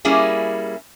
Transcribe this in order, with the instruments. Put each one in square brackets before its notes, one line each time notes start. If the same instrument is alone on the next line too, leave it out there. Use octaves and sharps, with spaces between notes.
[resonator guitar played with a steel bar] G3 A#3 C#4 E4 G#4